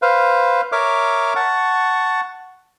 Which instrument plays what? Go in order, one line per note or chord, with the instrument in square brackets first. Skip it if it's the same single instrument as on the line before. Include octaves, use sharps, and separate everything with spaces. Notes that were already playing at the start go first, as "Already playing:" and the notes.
[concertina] B4 C5 F5
A#4 C#5 E5 D6 F6
F#5 A5 C#6